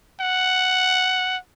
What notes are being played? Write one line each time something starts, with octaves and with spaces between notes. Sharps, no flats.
F#5